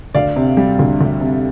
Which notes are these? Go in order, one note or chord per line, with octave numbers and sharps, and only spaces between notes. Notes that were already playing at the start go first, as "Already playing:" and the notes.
D2 D5 F5
C3
G3
D2
D2
C3